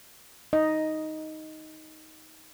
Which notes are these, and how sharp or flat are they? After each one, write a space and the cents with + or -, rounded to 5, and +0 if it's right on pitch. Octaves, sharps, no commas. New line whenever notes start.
D#4 +10 D#5 +0